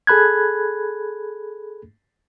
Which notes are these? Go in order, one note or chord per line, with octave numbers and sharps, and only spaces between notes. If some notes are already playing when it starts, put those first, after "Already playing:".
G#4 A4 B5 F#6 G#6